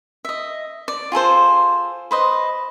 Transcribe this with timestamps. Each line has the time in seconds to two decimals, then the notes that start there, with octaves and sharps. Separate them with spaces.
0.25 D#5 E5
0.88 D5
1.12 F4 G#4 A4 C5
2.11 B4 C5 D#5